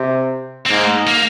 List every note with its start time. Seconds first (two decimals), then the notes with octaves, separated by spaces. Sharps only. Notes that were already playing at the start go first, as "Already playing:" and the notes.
Already playing: C3
0.66 C4
0.70 G#2 A#3
1.07 A#3